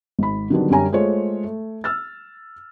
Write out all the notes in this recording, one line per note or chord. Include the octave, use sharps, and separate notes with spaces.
G#1 B5
D3 D#3 F#3 G3 B3 D4
F#2 D3 G3 C#4 G#5 A#5
G#3 A3 F4 C5 C#5
A3
E6 F6 A6